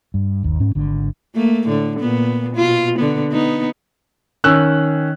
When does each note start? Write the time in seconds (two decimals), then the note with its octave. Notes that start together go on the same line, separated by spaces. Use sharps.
0.14 G2
0.43 G1 D#2
0.60 G#2 C#4
0.75 G#1 D3
1.35 A3 A#3
1.67 A2 D3
1.99 A#2 B3
2.55 B2 F4
2.98 D3 B3
3.31 B3 D#4
4.44 D#3 C#4 E6 F#6